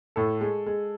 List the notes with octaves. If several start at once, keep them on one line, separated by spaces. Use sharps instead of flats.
A2 A4
G#3
G#3